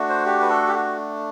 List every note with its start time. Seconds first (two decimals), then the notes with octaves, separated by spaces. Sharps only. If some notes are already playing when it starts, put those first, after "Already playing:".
Already playing: A3 D4 F#4
0.09 C5
0.26 G4
0.42 B4
0.50 A4
0.68 G4
0.75 F#4